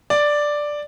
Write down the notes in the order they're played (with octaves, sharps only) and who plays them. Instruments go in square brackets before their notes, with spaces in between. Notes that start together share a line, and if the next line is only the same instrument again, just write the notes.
[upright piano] D5